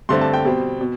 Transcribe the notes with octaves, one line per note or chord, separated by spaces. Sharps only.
G2 D3 A3 C4 C6
A5
G5
B2 G3 C4
B2